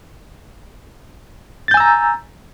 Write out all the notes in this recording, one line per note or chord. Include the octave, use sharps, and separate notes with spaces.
G#5 A#5 E6 G6 A6